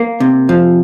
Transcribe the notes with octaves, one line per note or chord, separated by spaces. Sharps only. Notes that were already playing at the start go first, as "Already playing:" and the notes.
Already playing: A#3
C3
F3